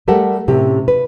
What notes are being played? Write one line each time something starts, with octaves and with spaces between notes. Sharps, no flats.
G3 A3 G4 A4 A#4 F#5
A2 C3 C#4 G4
B4